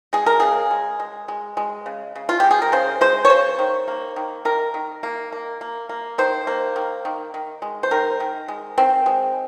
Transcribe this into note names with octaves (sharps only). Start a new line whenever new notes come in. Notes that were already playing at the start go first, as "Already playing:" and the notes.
G#3 G#4
A#4
C#3 G#4
G#3
G#3
G#3
G#3
C#3
C#3
F4
G#3 G4
G#4
A#4
C#3 C5
G#3 C5
C#5
C#3 C5
D#3
A#3
D#3
D#3 A#4
D#3
A#3
A#3
A#3
A#3
D#3 C5
A#3
D#3
D#3
D#3
G#3
C5
D#3 A#4
D#3
G#3
D#3 C4
G#3